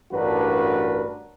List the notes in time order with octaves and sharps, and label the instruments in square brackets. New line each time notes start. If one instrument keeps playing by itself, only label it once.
[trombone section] A1 G2 D4 F#4 A#4 B4